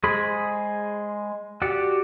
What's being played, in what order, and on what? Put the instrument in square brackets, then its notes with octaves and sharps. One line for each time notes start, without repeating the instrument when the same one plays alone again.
[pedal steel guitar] G#3 G#4 C5 B5
F#4 G4 D5 F#5